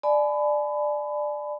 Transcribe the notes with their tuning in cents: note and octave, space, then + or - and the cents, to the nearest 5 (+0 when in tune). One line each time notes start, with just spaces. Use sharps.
D5 +15 G#5 +40 B5 +25